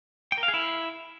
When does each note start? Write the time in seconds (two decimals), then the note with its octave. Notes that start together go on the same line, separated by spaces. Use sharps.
0.32 G5
0.38 A#4
0.43 F5
0.48 G#4
0.54 E4